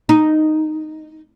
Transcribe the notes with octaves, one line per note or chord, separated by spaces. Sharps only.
D#4